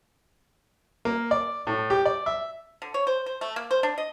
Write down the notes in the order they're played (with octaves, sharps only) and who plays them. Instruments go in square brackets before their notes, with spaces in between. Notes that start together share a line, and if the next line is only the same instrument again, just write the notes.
[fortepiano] A#3
D5
A2
G4
D5
E5
[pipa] D3
C#5
C5
C5
A3
A#3
C5
D4
D#5